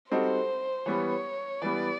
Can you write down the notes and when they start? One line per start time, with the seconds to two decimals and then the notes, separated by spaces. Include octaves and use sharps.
0.11 G3 C4 D#4 F#4 A4 C5
0.86 E3 G3 B3 C#5
1.61 E3 G3 B3 D5